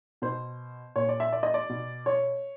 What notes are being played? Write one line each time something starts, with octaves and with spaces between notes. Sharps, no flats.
B2 C5
A#2 C#5
D5
E5
D5
D#5
D5
B2
C#5